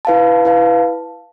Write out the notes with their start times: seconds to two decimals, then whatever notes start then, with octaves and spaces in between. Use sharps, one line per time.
0.05 E4 B4 F5 A5
0.45 E4 B4 F5 A5